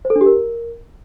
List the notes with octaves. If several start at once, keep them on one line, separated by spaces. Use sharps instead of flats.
C5
A4
D4
G4
A#4